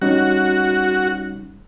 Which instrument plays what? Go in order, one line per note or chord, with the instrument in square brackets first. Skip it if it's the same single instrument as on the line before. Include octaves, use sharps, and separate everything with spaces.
[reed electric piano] G3 C#4 D#4 [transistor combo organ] F#4